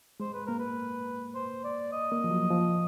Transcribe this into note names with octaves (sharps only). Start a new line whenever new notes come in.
G#3 C5
B4
A#3 A#4
B4
C5
D5
D#5
A#3
F3
F#3
F3